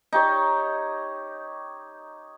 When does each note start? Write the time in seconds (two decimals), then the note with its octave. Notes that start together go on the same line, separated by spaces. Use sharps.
0.13 D#4 G4 C#5